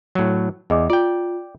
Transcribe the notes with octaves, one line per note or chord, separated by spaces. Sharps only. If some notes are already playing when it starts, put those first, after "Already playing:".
A2 F#3
E2 G#4 D#5 D6
F4 D5 G5